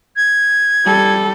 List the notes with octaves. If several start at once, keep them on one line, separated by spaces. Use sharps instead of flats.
G#6
G3 A4